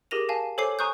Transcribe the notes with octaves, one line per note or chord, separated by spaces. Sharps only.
G4 G#4 A#4 A#6 D#7 F7
F5 G#5 A5
A4 C5 C#5 G#5 D6 C7
G#5 A#5 C#6 D#6 F#6 G6